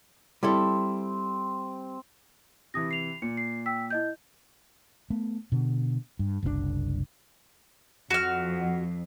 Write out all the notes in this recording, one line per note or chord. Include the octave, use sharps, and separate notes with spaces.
G3 C4 E4 A4
C3 E3 E4 D#6 A#6
C7 F7
A#2 C#7
C7
G5 E6 B6
E4 D#5 G6
A3 B3
B2 D3
G2
F#1 C2 C3 D4
F2 F#4 F6